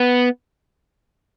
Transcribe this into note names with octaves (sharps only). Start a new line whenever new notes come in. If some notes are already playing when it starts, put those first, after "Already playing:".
Already playing: B3